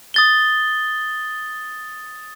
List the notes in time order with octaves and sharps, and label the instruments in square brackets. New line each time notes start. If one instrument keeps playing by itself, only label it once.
[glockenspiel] D#6 A6 G7